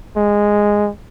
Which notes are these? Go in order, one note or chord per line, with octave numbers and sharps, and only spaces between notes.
G#3